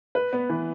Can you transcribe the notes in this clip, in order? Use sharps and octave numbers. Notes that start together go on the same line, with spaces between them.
B4
B3
E3